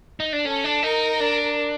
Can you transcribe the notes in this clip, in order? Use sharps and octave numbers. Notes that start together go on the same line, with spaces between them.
D#4
D4
C#4 A4
D4
D#4 A#4
D4